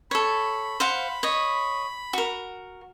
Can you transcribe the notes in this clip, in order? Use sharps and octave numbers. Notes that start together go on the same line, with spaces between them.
A4 C#5 B5
C5 F5 F#5
C#5 D#5
F#4 A#4